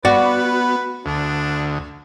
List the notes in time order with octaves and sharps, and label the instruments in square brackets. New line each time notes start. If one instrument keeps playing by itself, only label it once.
[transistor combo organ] B3 [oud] F#4 [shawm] B4 [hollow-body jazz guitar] D5
[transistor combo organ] D2 [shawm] D4